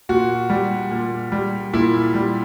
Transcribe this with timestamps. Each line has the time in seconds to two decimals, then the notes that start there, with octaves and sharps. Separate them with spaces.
0.09 A#2 F#4
0.50 G3
0.91 A#2
1.32 G3
1.73 A#2 E4
2.14 G3